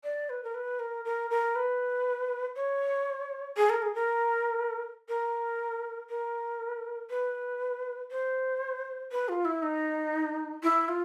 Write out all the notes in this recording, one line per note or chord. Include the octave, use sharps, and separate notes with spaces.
D5
B4
A#4
B4
A#4
A#4
A#4
B4
C#5
G#4
A#4
G#4
A#4
A#4
A#4
B4
C5
B4
F4
E4
D#4
E4
F4